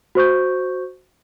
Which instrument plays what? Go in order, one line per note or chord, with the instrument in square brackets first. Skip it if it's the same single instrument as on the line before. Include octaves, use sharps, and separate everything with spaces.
[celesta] F#4 C5 C#6 G6